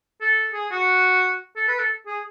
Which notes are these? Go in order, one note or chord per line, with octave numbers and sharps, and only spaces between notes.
A4
G#4
F#4
A4
B4
A4
G#4